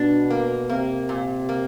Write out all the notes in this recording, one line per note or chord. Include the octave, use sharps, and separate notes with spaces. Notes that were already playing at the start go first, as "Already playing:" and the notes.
Already playing: B2 D4
A#3
C3 A#3
A#2
A#3